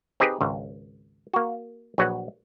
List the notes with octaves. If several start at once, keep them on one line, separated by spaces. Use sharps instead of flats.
C4 D#4 G4 G#4 B4
G#1 C#2
A#3 F#4
A#1 F#3 F#4 B4 C#5 F#5